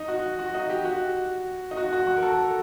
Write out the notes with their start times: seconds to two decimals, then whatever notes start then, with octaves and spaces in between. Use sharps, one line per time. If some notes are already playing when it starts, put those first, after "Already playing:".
Already playing: D#4
0.08 F#4
0.39 F#4
0.55 D#4
0.70 G4
0.85 F#4
1.71 D#4
1.77 F#4
1.93 F#4
2.07 F#4
2.17 A#4
2.23 A4